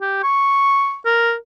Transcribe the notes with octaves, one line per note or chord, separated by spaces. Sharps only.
G4
C#6
A#4